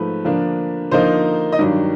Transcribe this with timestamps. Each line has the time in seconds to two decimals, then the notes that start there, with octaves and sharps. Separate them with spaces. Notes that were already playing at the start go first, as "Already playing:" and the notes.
Already playing: G#2 F3 A3 B4
0.24 D3 F3 A#3 D4
0.91 D3 F3 A#3 D#4 C5
1.53 D#5
1.59 G2 D#3 F#3 D5